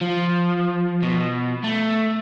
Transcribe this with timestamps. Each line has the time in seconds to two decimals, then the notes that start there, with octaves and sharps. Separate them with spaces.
0.02 F3
1.03 B2
1.64 A3